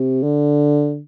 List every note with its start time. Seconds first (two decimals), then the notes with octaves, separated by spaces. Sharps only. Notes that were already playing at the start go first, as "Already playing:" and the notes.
Already playing: C3
0.23 D3